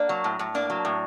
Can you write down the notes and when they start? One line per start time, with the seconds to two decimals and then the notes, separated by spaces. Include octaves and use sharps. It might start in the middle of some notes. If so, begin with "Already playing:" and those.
Already playing: A#3 D4
0.09 F#3
0.24 A2
0.39 A2
0.55 A#3 D4
0.70 F#3
0.85 A2